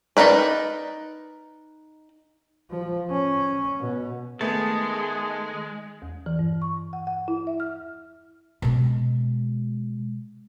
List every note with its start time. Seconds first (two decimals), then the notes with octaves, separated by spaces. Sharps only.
0.17 D#4 F#4 A#4 B4 D5
2.70 F3
3.10 C#4
3.79 B2
4.41 D#3 G#3 A3 B3 G#4 A5
6.02 E2
6.26 E3
6.39 G2
6.62 C#6
6.93 F#5
7.07 F#5
7.28 E4
7.47 E5
7.60 F6
8.62 B2 G#3